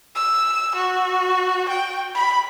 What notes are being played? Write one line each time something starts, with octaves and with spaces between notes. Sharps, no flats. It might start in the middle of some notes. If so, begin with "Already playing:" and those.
E6
F#4
G5
B5